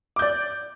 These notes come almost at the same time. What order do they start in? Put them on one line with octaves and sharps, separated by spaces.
D6 G6 D5